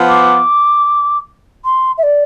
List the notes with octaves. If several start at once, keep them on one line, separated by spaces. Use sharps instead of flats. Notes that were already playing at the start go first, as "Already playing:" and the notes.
Already playing: F3 B3 F4
D6
C6
E5
D5